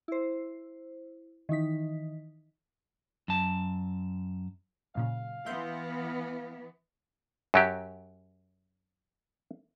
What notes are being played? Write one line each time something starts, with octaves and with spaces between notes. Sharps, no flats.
E4 C5
D#3 E3 D#4 B6
F#2 A5
F#2 A#2 C#3 F5
E3 B3 E5 C6 G6
F#2 F#3 G4